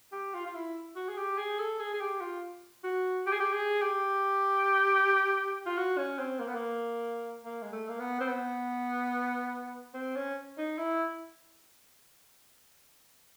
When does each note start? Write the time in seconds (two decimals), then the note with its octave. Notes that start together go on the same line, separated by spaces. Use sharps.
0.12 G4
0.34 F4
0.45 F4
0.55 E4
0.96 F#4
1.09 G#4
1.18 G4
1.38 G#4
1.59 A4
1.80 G#4
1.93 G#4
2.00 G4
2.21 F4
2.84 F#4
3.26 G4
3.33 G#4
3.40 G4
3.53 G#4
3.82 G4
5.66 F4
5.77 F#4
5.97 C#4
6.19 C4
6.39 A#3
6.48 B3
6.54 A#3
7.44 A#3
7.62 G#3
7.72 A3
7.89 A#3
7.99 B3
8.20 C4
8.28 B3
9.94 C4
10.16 C#4
10.58 D#4
10.78 E4